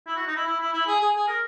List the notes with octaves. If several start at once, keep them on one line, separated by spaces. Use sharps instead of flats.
E4
F#4
D#4
E4
E4
E4
E4
G#4
G#4
G#4
A#4